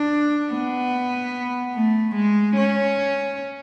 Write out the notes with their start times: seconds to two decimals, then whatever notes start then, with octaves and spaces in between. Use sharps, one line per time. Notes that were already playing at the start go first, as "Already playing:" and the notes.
Already playing: D4
0.52 B3
1.75 A3
2.15 G#3
2.57 C#4